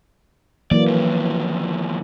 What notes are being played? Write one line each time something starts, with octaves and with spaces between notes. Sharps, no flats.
E3 F#3 A#3 D5
D#2 F3